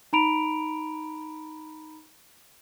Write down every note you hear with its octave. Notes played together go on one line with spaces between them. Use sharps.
D#4 A#5 B5 D7 F7